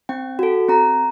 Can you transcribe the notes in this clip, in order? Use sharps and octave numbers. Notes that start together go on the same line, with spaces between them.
C4 G5
F#4 A4
C4 A#5